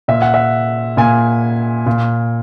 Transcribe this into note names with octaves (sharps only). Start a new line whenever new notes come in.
A#2 E5
F#5
E5
A#2 G#5
A#2